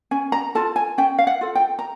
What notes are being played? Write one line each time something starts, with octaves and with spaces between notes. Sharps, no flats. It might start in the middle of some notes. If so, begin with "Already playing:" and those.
C#4 G#5
A#5
F4 A4 A5
G#5
C#4 G5
F5
F#5
F4 A4
G5
A#5